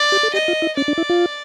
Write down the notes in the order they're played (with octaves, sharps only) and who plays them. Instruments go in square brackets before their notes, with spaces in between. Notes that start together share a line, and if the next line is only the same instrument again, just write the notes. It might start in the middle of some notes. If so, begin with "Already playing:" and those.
Already playing: [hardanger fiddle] D5
[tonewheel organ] G4
A4
[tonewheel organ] G4 [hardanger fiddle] D#5
[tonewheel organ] F4
E4
[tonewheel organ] C#4 [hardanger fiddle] D5
[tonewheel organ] D4
E4
F4